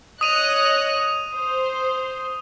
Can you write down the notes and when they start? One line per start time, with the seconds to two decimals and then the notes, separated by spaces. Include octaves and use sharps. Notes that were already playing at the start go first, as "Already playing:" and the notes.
0.21 C#5 D#5 D#6 F#6 D#7 F7
1.35 C5